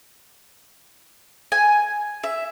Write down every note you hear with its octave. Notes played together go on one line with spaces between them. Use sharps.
G#5
E5